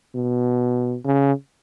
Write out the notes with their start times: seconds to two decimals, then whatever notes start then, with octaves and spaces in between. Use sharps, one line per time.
0.15 B2
1.04 C#3